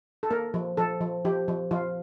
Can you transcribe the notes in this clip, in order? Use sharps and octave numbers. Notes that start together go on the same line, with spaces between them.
A4
A#3 A#4
F3
F3 A4
F3
F3 G4
F3
F3 F4